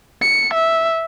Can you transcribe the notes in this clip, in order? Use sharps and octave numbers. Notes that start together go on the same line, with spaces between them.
C#7
E5